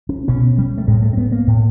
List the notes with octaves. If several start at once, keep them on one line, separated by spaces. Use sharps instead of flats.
C#4
B2 C#4
G3
A3
A2 G#3
A3
C4
B3
A#3
A2